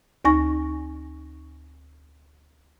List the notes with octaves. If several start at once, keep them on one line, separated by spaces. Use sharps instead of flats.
D2 D#4 G#5 C#6 A#6